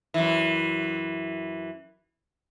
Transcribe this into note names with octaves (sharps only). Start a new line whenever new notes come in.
F#2 E3